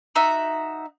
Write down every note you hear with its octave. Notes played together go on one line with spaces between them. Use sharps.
D#4 F#4 E5